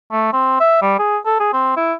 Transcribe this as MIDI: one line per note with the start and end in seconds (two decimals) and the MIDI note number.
0.12 0.33 57
0.33 0.55 60
0.60 0.78 76
0.82 0.96 55
0.99 1.18 68
1.26 1.37 69
1.40 1.49 68
1.53 1.73 60
1.77 1.93 64